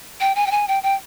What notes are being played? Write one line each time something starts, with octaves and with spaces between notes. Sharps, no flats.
G5
G#5
G5
G#5
G5
G5